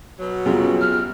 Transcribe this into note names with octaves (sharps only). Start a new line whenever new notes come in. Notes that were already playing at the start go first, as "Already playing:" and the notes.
B2 F#3
F#2 C#3 G3 B3 F4 G#4
F6